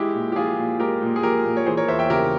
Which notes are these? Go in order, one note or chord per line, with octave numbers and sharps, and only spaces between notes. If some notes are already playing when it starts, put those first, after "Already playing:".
Already playing: G#3 E4 G4
A#2
G4
F3 F4 G#4
A#2
G#3 G4 A#4
A#2
G#4
F3 G4 A#4
A#2
C#5
E3 G#4 C5
A#4 C#5
E2 C5 E5
E5 G5
C#3 G4 A#4